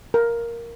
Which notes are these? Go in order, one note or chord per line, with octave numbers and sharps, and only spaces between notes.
A#4